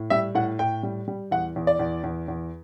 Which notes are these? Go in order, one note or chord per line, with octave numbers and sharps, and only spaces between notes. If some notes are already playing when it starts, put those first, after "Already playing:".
Already playing: A2
G3 E5
A2 F#5
A2 G5
G3
G3
E2 F#5
E2
D5
E2
E2
E2